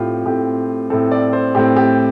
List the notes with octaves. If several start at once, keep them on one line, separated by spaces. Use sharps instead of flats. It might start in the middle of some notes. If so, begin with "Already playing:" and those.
Already playing: A2 A3 C4 F4 G4
A2 A3 C4 G4
A2 A3 C4 A4
D5
C5
A2 A3 C4 G4
G4